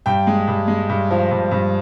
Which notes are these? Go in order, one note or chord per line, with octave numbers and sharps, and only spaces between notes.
G2 G5
G#3
G2
G#3
G2
F3
G2
G2